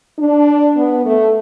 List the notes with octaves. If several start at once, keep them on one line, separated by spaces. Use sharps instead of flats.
D4
B3
A3